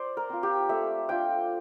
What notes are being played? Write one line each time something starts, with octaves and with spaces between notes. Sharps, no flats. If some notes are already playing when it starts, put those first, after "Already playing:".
Already playing: C5 D5
A#4
C4 F4
G4
A3 E5
D4 F4 G5